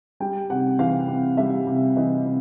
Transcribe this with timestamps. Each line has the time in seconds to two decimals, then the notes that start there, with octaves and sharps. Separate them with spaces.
0.20 G3 G5
0.50 C3 F#5
0.79 E3 F5
1.08 C3
1.37 G3 E5
1.67 C3
1.96 E3 D#5
2.26 C3